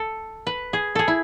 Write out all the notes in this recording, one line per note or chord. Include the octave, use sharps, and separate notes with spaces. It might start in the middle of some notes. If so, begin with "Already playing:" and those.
Already playing: A4
B4
G#4
G#4 A4
E4